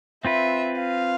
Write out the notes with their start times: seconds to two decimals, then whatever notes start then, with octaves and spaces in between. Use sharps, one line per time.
0.25 C4 F4 B4 E5
0.79 F5